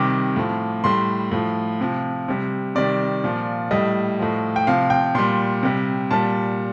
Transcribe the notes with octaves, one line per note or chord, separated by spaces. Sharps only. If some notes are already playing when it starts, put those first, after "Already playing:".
Already playing: C3 D#3 G3 D6
A2 F3
A2 G3 C6
A2 F3
C3 F3
C3 G3
C3 D#3 G3 D5
A#2 F3
A2 G3 D#5
A2 F3
G5
C3 F3 F5
G5
A#2 G3 C6
C3 G3
A#2 G3 A5